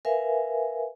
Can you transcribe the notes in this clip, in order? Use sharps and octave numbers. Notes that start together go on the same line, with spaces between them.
A#4 B4 E5 F5 G#5